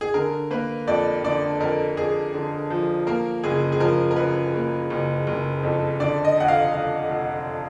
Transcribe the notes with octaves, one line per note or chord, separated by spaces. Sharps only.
G#4
D3 A#4
A#3 B4
F2 D5
D3 D5
F2 A#4
F2 G#4
D3
F3
A#3 A#4
F#1 G#4
G#4
F3 A#4
A#4
F#1 B4
A#3
F#1
F#1
F2
D3 D5
D#5
F1 F#5
F5
F1 F5
F1